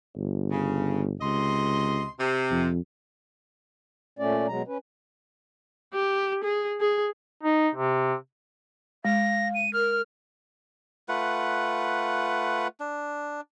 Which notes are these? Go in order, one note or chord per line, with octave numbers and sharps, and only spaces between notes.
G1
C#3
C#2 C3 D#5 C6
C3
F2
A#2 A3 C#4 D5
B2 F#3 G#3 A#5
C#4 B4
G4
G#4
G#4
D#4
C3
G#3 F5 A#6
D#7
A#4 F6
A3 F4 B4 F#5
D4